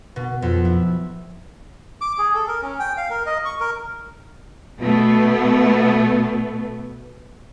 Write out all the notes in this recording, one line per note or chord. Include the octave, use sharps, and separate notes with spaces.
B2
F2
E4
D6
G#4
A4
A#4
C#4
G5
F5
A#4
D#5
C#6
A#4
B2 A3 B3